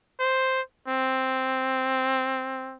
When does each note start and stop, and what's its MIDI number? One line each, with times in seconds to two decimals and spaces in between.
0.19 0.61 72
0.88 2.77 60